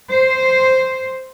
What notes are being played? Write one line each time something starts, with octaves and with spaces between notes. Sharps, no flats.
C5